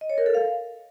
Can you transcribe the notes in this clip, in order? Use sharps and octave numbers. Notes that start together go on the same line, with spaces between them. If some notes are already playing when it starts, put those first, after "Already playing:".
D#5
C#5
A#4
A4
F5